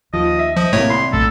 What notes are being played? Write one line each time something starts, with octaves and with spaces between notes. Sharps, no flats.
D#2 F3 D#5
E5
F3 D#5
F#2 A2 C3 D#3 A3 A#3 C#5
C2 B5 C6 B6
A#1 A2 A4